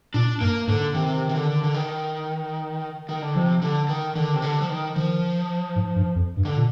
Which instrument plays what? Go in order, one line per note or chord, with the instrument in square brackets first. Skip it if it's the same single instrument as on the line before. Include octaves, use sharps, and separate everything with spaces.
[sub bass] A#2 [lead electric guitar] D4
[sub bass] G2 [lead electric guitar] A#3
[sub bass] G#2 [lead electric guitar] D3
[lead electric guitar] C3 [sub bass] D#3
[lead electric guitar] C3
D3
D3
D#3
D#3
D3
[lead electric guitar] C3 [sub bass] F3
[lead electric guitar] D3
D#3
[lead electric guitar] D3 [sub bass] D#3
[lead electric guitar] C3
D3
F3
D#3
[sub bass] D#3 [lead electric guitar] F3
[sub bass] G#2
G2
F2
G2
[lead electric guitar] D3
[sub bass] A#2